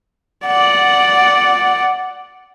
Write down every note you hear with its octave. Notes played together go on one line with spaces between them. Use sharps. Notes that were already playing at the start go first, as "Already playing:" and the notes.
D5 F#5